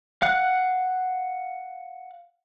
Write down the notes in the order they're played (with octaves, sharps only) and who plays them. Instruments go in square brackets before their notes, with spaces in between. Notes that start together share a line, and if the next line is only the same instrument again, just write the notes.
[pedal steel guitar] F5 F#5 F#6